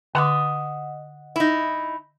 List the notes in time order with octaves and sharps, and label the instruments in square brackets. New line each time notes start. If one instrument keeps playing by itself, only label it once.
[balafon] D3 C6 D6 [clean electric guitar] D#5 F#5
[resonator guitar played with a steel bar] D#4 E4